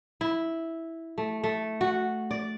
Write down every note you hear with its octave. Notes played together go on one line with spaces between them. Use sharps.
E4
A3
A3
F#4
D5